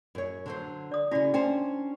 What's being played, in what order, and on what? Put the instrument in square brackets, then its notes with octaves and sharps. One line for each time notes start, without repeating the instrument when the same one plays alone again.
[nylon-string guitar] F#2 C#5
D3 F#3 C5
[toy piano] D5 D#6
[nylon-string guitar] C#3 C#4 [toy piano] E4 F#4 D5
[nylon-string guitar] C#4 D4 C5 [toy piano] G5